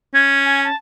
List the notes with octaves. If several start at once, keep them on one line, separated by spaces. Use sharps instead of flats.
C#4 G#6
G#5
A5